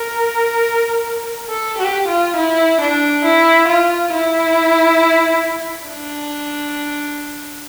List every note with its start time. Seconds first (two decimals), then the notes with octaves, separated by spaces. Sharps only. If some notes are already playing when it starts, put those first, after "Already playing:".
Already playing: A#4
1.49 A4
1.78 G4
2.08 F4
2.36 E4
2.81 D4
3.25 E4
3.68 F4
4.12 E4
5.87 D4